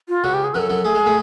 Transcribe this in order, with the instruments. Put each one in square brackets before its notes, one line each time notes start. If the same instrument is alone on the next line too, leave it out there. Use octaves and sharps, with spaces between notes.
[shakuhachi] F4
[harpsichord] C#2 C#3 [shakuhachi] F#4
[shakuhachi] G4
G#4
[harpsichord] F#2 F#3 [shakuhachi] A4 B4
[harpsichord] F#2 F#3
[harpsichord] A3 [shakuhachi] G#4
[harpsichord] G#3
A2 A3